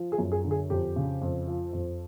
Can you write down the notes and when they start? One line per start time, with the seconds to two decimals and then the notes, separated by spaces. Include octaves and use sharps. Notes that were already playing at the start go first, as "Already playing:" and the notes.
Already playing: F3
0.12 G#4
0.18 F#2
0.32 G#4
0.44 D3
0.51 G#4
0.70 F2 G4
0.96 C#3
1.22 F2
1.47 F3
1.73 F2